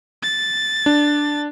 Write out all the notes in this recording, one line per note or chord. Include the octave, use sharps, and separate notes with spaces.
A6
D4